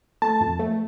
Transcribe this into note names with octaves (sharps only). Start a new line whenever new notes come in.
A3 A5
F2
A3